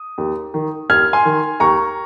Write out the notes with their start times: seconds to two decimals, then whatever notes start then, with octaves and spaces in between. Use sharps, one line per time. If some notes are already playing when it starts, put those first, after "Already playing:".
Already playing: D#6
0.18 D#2
0.54 D#3
0.90 D#2 F6 G#6
1.13 G#5 C6
1.25 D#3
1.60 D#2 A#5 C#6